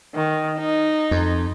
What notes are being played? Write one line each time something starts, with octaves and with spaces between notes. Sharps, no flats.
D#3
D#4
F2